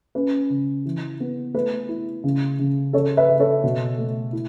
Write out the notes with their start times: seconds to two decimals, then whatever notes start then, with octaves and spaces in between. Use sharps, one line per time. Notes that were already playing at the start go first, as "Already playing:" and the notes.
0.15 C#4 B4
0.50 C#3
0.86 E3
1.20 B3
1.54 A3 B4
1.89 E4
2.24 C#3
2.59 C#3
2.93 C#3 A4 C#5
3.17 B4 E5
3.29 C#3
3.40 A4 C#5
3.64 B2
3.98 A3
4.33 E4